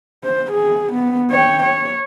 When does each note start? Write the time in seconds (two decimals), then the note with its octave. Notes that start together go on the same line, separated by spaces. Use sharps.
0.24 C5
0.52 G#4
0.93 B3
1.31 C#5 G5
1.63 C#5